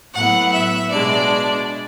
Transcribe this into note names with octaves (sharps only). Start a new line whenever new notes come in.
A2 F#3 B3 E4 F#5
E5
B2 G#3 D4 D5